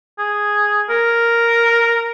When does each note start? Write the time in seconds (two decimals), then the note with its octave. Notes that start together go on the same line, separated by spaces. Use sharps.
0.18 G#4
0.90 A#4